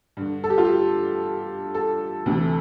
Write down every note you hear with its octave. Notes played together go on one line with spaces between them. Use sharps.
G2 D3
A4
G4
F4
G4
A4
D2 C3 E3